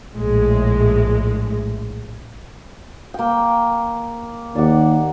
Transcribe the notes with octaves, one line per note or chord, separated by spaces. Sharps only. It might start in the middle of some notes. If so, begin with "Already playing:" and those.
A#1 A2 G#3
A#3 G5
D#2 D5 F#5